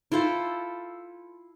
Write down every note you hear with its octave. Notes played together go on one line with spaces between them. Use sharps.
E4 F4 A4 C5